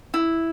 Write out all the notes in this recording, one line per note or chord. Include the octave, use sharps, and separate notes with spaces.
E4